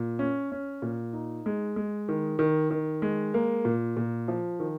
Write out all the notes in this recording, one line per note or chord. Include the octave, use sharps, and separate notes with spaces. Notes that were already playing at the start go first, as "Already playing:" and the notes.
Already playing: A#2
C#4
C#4
A#2
D#4
G#3
G#3
D#3
D#3
D#3
G#3
A#3
A#2
A#2
F3
D#3